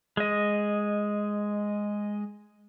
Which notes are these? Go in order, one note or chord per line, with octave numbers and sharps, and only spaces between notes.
G#3 D#5